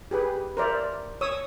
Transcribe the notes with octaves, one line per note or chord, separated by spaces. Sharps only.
G4 G#4 B4
A#4 C5 D5 E5
C#5 D#6 E6